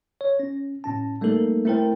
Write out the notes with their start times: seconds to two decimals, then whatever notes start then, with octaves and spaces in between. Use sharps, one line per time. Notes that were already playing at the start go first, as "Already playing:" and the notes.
0.21 C#5
0.39 C#4
0.84 A2 C#4 A5
1.21 G3 A3 A#3 D#4 A4 A#4
1.65 A3 C4 E4 A#4 C5 G5